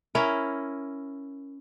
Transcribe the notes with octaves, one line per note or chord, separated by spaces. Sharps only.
C#4 E4 A#4